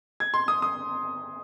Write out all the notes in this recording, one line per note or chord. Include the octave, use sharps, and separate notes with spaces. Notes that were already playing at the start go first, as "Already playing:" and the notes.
G#6
C6
D#6
D#6